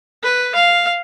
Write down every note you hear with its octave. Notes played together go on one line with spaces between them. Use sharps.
B4
F5